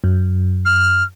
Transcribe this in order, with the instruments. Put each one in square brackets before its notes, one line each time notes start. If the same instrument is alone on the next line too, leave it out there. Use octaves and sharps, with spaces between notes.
[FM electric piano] F#2
[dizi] F6